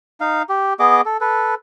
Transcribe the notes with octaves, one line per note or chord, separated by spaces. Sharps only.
D#4 F5
G4
B3 G#4 D#5 D6
A4
A4 B4